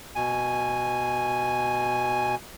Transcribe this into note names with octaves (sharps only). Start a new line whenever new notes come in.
B2 G#5